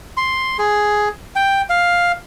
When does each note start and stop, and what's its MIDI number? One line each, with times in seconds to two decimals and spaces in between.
0.17 0.57 84
0.59 1.09 68
1.36 1.62 79
1.70 2.12 77